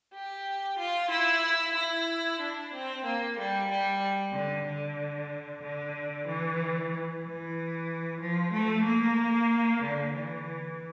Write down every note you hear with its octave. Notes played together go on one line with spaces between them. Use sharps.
G4
F4
E4
E4
D4
C4
A#3
G3
G3
D3
D3
D3
E3
E3
F3
A3
A#3
D3
E3